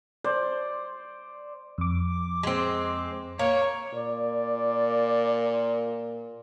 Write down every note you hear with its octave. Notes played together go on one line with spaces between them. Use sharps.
C5 D5
F2 D6
G#3 C4
A#3 C#5
A#2 D5